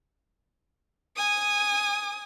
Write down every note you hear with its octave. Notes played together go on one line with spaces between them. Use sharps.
G#5 D#6